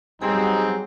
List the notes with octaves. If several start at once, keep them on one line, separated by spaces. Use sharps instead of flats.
F#3 G3 B3 C4 D#4 G4 G#4 G#5